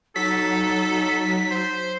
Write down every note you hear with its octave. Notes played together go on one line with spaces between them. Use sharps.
F#3 D#4 A4 B6
C5